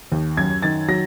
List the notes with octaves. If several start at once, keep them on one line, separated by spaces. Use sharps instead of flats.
D#2
F#2 G#6
D#3 A6
F#3 A#6